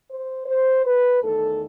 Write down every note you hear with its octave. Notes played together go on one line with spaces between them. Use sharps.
C5
C5
B4
E2 D#3 A3 A4